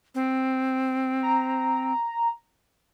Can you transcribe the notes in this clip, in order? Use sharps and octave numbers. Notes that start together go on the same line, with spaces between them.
C4
A#5